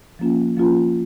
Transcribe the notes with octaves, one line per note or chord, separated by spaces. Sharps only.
F3 A#3 C#4 F4
F3 A#3 C#4 F4